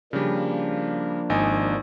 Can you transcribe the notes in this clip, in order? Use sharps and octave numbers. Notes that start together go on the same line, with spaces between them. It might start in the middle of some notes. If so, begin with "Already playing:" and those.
C#3 F3 G3 A#3 D4
G#1 D#4 G#5